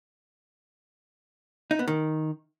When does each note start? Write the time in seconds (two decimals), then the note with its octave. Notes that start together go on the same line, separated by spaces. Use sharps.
1.71 D#4
1.79 B3
1.88 D#3